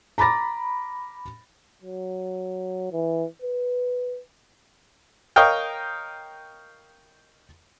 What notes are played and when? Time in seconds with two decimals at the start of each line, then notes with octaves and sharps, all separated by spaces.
0.18 A#5 B5 D6 A6 A#6
1.82 F#3
2.92 E3
3.42 B4
5.36 A#4 C#5 D#5 F5 G5